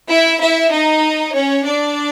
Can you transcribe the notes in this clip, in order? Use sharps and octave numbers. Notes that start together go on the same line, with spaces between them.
E4 E5
E4 E5
D#4 D#5
C#4 C#5
D4 D5